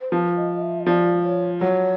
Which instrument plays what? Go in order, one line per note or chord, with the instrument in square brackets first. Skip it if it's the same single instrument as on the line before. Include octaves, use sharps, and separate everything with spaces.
[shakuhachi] C5
[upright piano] F3 [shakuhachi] B4
[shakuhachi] D#5
D#5
E5
D#5
[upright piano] F3 [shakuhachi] D5
[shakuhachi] C#5
[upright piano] F#3 [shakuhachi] C#5